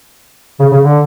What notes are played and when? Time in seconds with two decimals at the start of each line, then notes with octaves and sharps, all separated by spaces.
0.60 C#3
0.72 C#3
0.83 D3